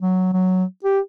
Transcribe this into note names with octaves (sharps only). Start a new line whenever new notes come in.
F#3
F#3
G4